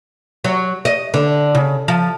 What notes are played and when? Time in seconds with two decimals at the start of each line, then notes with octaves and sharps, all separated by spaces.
0.44 F#3
0.85 D#5
1.14 D3
1.55 C#3
1.88 F3